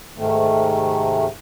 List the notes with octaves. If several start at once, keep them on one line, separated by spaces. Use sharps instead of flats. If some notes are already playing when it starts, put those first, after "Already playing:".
G#2 C3 D#3 A3